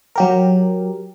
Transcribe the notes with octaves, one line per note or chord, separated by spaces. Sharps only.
F#3 G4 A#4